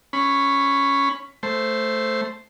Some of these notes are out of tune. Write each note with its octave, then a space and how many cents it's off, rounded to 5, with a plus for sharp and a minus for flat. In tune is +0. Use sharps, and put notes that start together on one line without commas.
C#4 +0 B5 +15
A3 +0 C5 +0